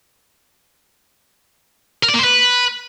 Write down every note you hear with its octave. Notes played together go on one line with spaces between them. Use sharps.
A#4
D5
A#3
C5
B4